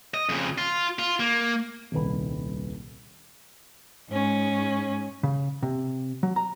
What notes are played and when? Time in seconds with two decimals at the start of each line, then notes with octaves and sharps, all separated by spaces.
0.14 D#5
0.29 F2 C#3
0.58 F4
0.99 F4
1.20 A#3
1.92 D#1 C2 D#3 B4 B5
4.10 G#2 C#4
5.23 C#3
5.63 C3
6.23 F#3
6.36 A#5